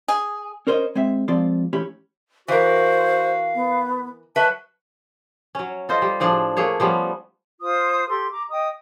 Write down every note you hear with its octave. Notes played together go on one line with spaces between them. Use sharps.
G#4
C#4 A#4 C5 C#5 D#5
G#3 C4 E5
F3 G#3 C4 F4 C5 D5
A2 E3 C#4 G4 C#5 B5
E3 F#4 A#4 C5 F5
B3
F#3 B4 E5 A5
F#3 C#4
F4 A4 C5 D#5
G3
A2 F3 D4 G#4
A3 A#3 G#4 C#5
F3 G3 B3 C#4
F4 C5 D#6
G4 A4 C6
A#5 D6
D#5 G5 D#6